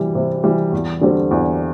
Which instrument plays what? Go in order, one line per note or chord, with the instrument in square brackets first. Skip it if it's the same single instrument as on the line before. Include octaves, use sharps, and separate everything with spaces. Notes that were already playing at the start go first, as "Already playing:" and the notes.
Already playing: [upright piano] C3 E3 G3
C3
E3 G3
E2
D3 G3 C4
E2